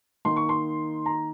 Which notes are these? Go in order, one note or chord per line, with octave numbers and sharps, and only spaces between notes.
D#3 A#3 D#4 C6
C#6
C6
A#5